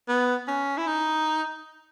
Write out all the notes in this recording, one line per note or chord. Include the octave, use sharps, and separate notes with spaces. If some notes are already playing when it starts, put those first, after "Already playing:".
B3
C#4
E4
D#4